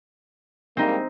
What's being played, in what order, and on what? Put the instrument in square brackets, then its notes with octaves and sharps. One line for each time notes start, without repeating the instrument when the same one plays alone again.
[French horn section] G3 G#3 A#3 [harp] C4 D#4